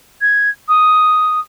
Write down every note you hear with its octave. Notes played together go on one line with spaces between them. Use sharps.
G#6
D#6